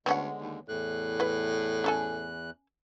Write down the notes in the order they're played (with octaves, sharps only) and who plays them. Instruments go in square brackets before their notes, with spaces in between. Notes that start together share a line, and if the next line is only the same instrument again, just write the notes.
[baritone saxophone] D2 [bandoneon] D3 G#3 [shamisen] B3 C#4 F#5
[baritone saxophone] D#2
[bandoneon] E2 F#6 [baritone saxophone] A2
[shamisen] E4 B4
C#4 A4 G#5